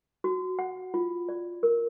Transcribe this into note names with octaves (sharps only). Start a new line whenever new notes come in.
F#4
F#5
F4
D5
A#4